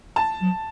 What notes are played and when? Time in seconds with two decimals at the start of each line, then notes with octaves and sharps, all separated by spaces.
0.16 A5
0.41 F#3